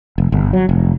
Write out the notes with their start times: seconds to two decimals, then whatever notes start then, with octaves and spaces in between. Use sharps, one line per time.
0.18 F1
0.32 G1
0.53 F#3
0.69 F1